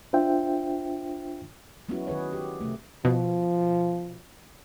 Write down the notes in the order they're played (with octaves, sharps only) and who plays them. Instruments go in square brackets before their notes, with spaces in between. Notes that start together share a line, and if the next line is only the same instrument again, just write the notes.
[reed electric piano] D4 F4 C5 E5 G5
[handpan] F#3 G#3 B3 C#4 E4 F#4
D#3 G#4 B4 C#5
G4
C3 A3
[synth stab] B2 [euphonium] F3